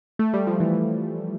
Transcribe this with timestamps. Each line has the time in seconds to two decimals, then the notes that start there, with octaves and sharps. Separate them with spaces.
0.19 A3
0.34 G3
0.47 F3
0.60 E3